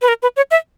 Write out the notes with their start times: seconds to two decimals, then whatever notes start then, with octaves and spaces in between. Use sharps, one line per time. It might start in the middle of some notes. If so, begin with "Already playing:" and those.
0.02 B4
0.08 A#4
0.22 B4
0.36 C#5
0.51 E5